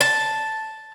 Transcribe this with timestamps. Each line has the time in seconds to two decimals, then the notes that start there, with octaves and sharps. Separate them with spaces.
0.01 A5